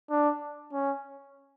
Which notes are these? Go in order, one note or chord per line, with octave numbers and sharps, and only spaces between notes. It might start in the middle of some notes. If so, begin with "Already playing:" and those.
D4
C#4